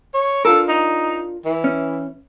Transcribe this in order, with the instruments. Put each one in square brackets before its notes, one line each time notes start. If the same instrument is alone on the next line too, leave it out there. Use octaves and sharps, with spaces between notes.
[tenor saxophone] C#5
[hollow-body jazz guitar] D4 F4 A#4 [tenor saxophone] A4
[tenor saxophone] D#4
E3
[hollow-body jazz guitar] C#4